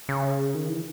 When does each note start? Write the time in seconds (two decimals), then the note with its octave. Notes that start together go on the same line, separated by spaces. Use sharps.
0.09 C#3
0.55 D#3
0.68 E3